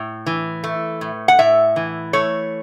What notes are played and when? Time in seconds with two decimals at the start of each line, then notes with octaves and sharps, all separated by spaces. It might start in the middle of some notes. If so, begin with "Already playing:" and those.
Already playing: A2
0.26 E3
0.64 A3
1.01 A2
1.28 F#5
1.39 A2 E5
1.76 E3
2.13 A3 C#5